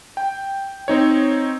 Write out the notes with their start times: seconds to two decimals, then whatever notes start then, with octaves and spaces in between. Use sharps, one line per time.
0.17 G5
0.88 C4 D#4 C#5